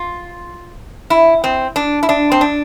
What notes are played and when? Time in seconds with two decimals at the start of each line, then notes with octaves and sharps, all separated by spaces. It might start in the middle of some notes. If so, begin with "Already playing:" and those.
Already playing: F4
1.10 E4
1.44 C4
1.76 D4
2.03 E4
2.09 D4
2.32 C4
2.41 D4